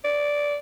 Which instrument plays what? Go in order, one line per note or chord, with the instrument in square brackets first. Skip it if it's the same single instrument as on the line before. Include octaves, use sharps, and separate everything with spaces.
[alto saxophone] D5